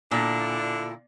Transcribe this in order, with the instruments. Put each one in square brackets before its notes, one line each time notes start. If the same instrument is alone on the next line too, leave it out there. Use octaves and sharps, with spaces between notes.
[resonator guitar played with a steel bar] A#2 [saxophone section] D3 D4 E4